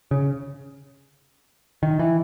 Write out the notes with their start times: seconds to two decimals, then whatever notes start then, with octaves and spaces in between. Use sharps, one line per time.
0.11 C#3
1.83 D#3
1.99 E3